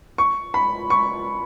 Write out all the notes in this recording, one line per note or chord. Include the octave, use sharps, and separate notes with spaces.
C#6
B5
C#6